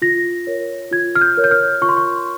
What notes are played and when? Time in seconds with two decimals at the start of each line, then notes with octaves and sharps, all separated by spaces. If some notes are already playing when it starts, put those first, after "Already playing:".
0.02 F4 A#6
0.47 A#4 C#5
0.91 F4 G#6
1.15 F6
1.21 G6
1.38 A#4 C#5
1.44 G6
1.51 F6
1.82 F4 C#6
1.89 C6
1.97 C#6